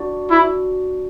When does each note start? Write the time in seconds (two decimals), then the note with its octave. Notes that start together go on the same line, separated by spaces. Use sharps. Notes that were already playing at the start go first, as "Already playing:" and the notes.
Already playing: D4 F#4 D5
0.31 E4